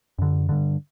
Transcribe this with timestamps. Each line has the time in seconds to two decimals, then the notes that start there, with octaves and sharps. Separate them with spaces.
0.19 F#2 D3
0.49 G2 D3